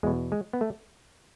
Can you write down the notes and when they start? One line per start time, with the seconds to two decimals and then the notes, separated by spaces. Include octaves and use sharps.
0.03 E2 B2 G#3
0.32 G#3
0.53 B3
0.61 A3